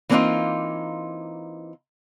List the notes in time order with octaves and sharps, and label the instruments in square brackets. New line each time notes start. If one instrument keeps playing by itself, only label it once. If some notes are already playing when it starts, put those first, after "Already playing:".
[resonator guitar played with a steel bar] E3 A#3 C4 D4 D#4 F4